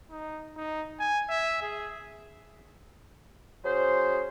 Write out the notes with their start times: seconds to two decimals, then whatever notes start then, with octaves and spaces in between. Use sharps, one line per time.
0.11 D#4
0.57 D#4
1.00 G#5
1.30 E5
1.62 G#4
3.63 F#3 C#4 G#4 C5